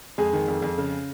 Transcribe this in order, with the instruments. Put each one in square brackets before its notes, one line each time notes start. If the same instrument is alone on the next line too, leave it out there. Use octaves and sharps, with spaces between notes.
[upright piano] F2 G#3 G#4
D#3
F2
F2
C#3